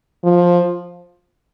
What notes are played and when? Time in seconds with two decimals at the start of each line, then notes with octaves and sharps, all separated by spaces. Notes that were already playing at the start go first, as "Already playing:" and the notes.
0.24 F3